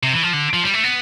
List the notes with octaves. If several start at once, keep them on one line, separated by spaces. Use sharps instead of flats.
C3
E3
F3
D3
F3
G3
A3
B3